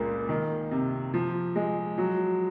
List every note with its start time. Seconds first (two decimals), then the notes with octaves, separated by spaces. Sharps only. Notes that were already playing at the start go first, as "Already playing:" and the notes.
Already playing: C#2 A#2 A#3
0.29 D#3
0.71 C3
1.14 F3
1.56 G#3
1.98 F#3